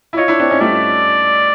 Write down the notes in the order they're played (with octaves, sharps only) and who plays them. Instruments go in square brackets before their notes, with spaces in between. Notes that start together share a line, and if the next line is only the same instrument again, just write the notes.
[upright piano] E4
[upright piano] D#4 F4 [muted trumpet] C#5
[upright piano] D4 E4
C4 D4
C#4 D#4
[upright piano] G3 A3 [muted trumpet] D5